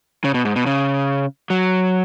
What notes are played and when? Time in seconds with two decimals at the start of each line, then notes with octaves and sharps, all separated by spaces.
0.24 C#3
0.34 B2
0.45 G#2
0.56 B2
0.66 C#3
1.50 F#3